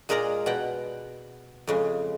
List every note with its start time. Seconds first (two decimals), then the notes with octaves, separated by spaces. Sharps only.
0.09 A#2 G#3 G#4 A#4 D5 A#5
0.46 B2 F#5 G5
1.67 F2 C#3 G#3